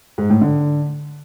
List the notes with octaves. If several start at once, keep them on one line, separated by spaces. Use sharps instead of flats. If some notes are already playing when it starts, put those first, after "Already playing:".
G#2
A2
D3